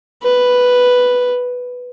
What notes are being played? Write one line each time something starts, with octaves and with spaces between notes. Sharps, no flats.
B4